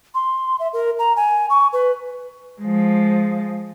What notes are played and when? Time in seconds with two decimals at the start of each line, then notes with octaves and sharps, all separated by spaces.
0.15 C6
0.60 E5
0.73 A#4
0.99 A#5
1.16 G#5
1.50 C#6
1.73 B4
2.61 F3 G#3